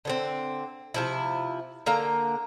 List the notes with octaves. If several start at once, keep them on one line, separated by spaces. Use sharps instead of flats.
D3 B3 C4
C3 F3 E4
D3 A#3 A#5